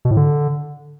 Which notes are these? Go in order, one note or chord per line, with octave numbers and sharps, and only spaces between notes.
B2
A2
D3